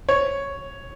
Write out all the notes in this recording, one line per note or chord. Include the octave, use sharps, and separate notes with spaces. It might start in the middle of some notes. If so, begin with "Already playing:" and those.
C#5